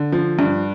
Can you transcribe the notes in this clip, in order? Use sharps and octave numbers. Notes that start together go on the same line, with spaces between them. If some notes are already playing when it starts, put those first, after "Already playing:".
Already playing: D3
F3
G2